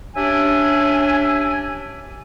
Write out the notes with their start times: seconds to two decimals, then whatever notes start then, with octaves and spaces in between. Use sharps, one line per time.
0.14 C#4 D4 G4 E5 G#5